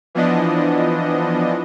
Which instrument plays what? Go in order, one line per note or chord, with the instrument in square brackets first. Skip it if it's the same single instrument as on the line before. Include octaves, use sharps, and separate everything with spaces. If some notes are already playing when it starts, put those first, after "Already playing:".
[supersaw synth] E3 F3 B3 D4 D#5